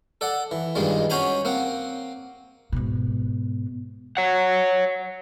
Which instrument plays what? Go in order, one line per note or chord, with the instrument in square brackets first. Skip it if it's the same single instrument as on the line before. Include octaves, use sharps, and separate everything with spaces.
[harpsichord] A4 D5 F#5
E3
G2 A#2 D#3 G3 G#3
C#4 F#4 C5 G#5 A#5 B5
A#3 C4 F#5
[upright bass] G#2 B2
[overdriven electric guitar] C#5 F#5